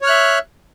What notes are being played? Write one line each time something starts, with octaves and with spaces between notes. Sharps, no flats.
C#5 E5 F6 F#6